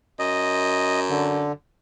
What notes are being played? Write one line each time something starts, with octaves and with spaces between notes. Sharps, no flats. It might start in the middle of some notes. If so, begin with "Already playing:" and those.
F#2 D#5
D3